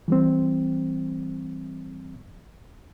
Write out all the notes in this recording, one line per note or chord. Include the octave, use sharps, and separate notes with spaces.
E3 G3 C4